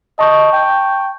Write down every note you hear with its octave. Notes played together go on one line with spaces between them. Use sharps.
D#5 A5 C#6 G6
G5